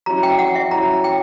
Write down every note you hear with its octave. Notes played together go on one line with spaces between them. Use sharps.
F#3 C#4 E4 A#5
G5
F#5
E5
F#3 C#4 E4 A#5
G5